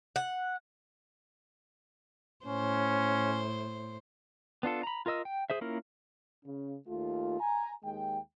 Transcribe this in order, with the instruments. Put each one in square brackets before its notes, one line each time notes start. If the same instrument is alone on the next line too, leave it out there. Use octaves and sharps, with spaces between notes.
[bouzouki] F#5
[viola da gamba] A2 C5 [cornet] C#4
[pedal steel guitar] B3 D4 F4 A4
A#5 B5
F4 A#4 D#5 E6
G5
G#4 C5 E5
A#3 C#4 E4 F4 A#4
[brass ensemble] C#3
D#2 A3 F4
G#5 A#5
D#2 G#3 G5